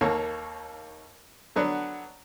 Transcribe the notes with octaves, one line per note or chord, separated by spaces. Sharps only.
D#2 A#3 A4 C#5
D3 F#3 B3 D4